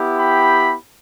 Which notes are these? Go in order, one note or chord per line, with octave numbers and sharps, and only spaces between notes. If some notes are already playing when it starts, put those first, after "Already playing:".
Already playing: B3 E4 G4
G5 B5